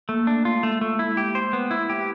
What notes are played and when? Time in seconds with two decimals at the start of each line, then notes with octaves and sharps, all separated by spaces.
0.09 A3 A#3
0.27 A3 D4
0.45 F4
0.51 G#3
0.63 A3
0.81 A3
0.99 G#3 E4
1.17 G4
1.35 C5
1.53 B3
1.71 E4
1.89 G4